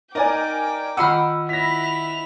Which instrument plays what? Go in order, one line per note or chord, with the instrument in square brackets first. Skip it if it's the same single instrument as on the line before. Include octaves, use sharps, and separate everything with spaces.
[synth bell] D#4 D#5 [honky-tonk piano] A#4 D5 G#5 [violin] G5 D6
[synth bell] D#3 F4 D#5 [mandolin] F#5 B5 F6 [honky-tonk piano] E6
[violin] E4 F7 [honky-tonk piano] A#6 B6